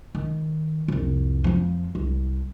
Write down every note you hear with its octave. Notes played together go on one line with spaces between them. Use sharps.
D#3
C2 F2
F2 F3
C2